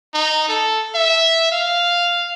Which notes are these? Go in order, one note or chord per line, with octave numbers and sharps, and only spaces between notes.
D#4
A4
E5
F5